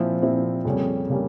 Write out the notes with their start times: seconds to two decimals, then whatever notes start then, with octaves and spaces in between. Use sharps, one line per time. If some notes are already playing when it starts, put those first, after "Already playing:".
Already playing: A#2 F3 C4 E4
0.22 A#2 F3 C4 E4
0.65 F2 C#3 G3 A#3 C#4
1.09 C#3 G3 A#3 C#4